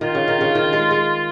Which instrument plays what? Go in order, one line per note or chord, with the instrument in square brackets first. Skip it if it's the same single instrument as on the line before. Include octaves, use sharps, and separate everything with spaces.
[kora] D#3 [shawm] F4
[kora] C#3
D#3
C#3
D#3
G#3
G#3